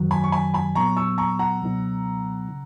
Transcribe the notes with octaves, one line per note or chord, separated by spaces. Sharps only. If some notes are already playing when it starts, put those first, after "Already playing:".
Already playing: F#2 D#3 F#3
G#5 B5
C#6
G#5 B5
G#5 B5
A#2 F#3 B3 A#5 C#6
C#6 E6
A#5 C#6
F#5 A#5
C#2 B2 F#3 B3 D#4
C#3